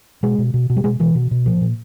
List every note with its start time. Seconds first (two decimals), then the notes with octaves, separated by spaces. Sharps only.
0.23 B2 G#3
0.38 B2
0.54 B2
0.70 B2
0.77 G3
0.84 B2 G#3
1.00 B2 E3
1.15 B2
1.31 B2
1.46 A#2 F3
1.61 A#2